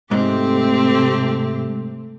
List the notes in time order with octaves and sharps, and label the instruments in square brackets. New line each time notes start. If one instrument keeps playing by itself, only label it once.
[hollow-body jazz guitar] G#2 [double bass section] C3 A3 [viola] C4 G4